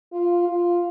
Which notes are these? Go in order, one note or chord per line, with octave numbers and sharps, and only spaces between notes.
F4
F4